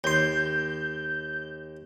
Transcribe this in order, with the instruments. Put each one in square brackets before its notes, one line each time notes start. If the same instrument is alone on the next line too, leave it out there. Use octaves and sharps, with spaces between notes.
[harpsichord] D#2 C6 [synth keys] G6